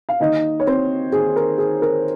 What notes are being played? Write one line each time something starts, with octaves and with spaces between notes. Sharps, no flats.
F5
D#2 D#3 D#4 D#5
C#5
C4 C5
D#2 D#3 G#4
A#4
G#4
A#4